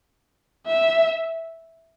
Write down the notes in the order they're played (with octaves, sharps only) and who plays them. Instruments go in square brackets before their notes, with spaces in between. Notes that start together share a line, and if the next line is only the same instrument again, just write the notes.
[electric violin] E5